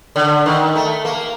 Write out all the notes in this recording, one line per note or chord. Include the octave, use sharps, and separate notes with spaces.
D3
D#3
A3
A#3